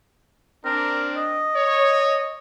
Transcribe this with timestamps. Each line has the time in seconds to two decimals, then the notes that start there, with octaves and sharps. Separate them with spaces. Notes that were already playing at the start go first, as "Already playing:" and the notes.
0.65 C4 D4 A#4
1.16 D#5
1.54 C#5